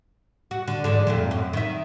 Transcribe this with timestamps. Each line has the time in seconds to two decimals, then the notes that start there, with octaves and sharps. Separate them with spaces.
0.51 F#4
0.68 D3
0.84 E2 G#2 D3
1.07 F2 A#2 A3
1.31 F#2
1.53 D#3 E5